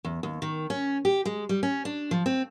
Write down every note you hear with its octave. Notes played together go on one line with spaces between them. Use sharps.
E2
D#2
D#3
C#4
G4
G#3
G3
C#4
D4
F3
C4